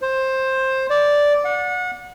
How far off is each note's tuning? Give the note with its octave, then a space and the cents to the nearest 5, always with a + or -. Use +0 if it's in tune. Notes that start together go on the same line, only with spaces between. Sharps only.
C5 +15
D5 -5
F#5 -30